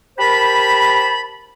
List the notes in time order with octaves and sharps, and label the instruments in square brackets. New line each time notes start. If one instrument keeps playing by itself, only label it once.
[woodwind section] G4 A#4 C5 A5 B5